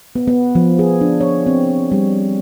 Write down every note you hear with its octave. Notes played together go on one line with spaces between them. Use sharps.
B3
B3
F3
G#4
D4
C#5
C4
G3